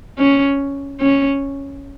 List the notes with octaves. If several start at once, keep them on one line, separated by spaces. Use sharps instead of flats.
C#4
C#4